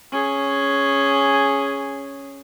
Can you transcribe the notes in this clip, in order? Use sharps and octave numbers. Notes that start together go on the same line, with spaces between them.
C#4 G#4